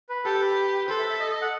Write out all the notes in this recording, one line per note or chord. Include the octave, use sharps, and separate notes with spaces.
B4
G4 A4
B4
A4 C5
E5
E5
D#5
D#5
F#5